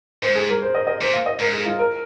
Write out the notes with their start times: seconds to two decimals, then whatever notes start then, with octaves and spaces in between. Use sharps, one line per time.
0.22 G#2 C5
0.35 G#4
0.49 A#4
0.62 C5
0.75 D#5
0.87 D#5
1.01 A#2 C5
1.13 F5
1.26 D#5
1.39 G#2 A#4
1.52 G#4
1.66 F4
1.79 A#4